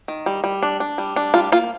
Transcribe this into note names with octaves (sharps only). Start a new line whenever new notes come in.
D#3
G3
G3
D4
D4
G3
D4
G3 F4
A#3 F4